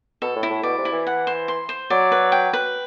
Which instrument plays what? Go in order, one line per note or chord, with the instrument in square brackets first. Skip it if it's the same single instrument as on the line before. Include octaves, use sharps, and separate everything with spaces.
[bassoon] B2 [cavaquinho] A4
[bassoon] A2
[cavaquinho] E4
[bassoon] A2
[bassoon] B2 [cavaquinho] D5
[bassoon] C3
[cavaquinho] E4
[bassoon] E3
[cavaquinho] F#5
C5
C6
C5
[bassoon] F#3 [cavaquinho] D5
[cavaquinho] B4
G5
B4